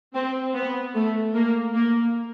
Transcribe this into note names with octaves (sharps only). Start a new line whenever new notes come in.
C4
B3
A3
A#3
A#3